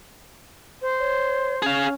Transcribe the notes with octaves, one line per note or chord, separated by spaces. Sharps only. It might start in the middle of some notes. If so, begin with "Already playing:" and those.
C5
C#5
C#4 G#4 F5